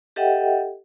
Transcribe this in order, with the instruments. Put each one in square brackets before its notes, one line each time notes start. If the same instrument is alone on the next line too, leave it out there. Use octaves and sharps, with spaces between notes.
[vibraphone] G4 A4 D#5 E5 F#5 G5